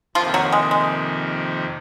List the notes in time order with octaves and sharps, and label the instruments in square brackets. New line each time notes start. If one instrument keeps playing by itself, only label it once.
[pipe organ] F2 C3 D#3 A#3 [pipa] F3 F4
[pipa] F#3 F#4
G#3
G#3